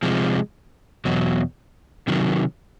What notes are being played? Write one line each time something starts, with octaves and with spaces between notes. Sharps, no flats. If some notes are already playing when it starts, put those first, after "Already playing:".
C3 F3 G#3
E2 B2 F#3
C3 D#3 F#3